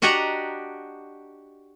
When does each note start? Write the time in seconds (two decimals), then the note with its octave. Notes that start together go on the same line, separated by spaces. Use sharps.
0.02 D4 F#4 G4 D#5 F#5 A#5